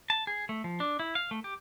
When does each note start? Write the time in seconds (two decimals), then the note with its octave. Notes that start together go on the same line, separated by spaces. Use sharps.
0.10 A5
0.27 G#4
0.49 A3
0.64 F3
0.80 D4
0.99 E4
1.15 F5
1.31 A3
1.44 G4